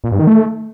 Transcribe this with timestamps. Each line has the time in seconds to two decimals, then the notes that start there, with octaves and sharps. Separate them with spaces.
0.04 A#2
0.12 G2
0.19 D#3
0.27 A3